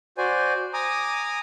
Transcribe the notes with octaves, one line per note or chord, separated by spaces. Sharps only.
F#4 C5 D5 G#5
G#5 A#5 D6 D#6